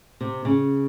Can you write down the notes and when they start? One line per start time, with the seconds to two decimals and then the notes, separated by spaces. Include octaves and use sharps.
0.21 C3
0.45 C#3